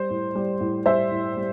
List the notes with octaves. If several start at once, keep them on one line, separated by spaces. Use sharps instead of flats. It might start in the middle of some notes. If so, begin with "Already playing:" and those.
Already playing: G3 C5
A2
G3
A2
G3 C5 E5
A2
G3